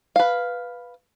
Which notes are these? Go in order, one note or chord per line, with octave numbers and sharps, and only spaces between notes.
B4 F5